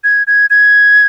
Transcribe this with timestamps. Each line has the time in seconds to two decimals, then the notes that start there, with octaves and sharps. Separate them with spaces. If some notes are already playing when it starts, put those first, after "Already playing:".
0.04 G#6
0.27 G#6
0.50 G#6